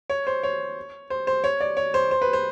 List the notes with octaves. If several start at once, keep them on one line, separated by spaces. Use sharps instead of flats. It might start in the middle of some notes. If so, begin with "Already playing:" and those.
C#5
C5
C#5
C5
C5
C#5
D5
C#5
C5
C5
B4
C5